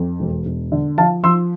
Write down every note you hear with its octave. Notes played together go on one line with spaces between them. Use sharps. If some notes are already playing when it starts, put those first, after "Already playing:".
Already playing: F2
E1
E1
D3
F3 F5 A5
F3 C6 E6